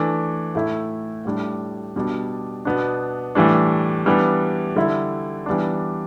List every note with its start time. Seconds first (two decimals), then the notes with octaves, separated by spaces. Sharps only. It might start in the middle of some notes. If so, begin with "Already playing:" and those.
Already playing: E3 A3 D4
0.55 A2 A3 E4
1.25 A2 G3 D4
1.96 B2 G3 D4
2.65 B2 B3 D4
3.35 A2 E3 G3 D4
4.06 E3 G3 B3 D4
4.76 D3 G3 E4
5.46 E3 G3 B3 D4